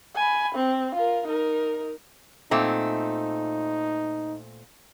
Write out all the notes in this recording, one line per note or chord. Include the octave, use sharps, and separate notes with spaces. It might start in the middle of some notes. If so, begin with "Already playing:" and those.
G#5 B5
C4
F4 A#4
D#4 A#4
A#2 A3 C4 D#4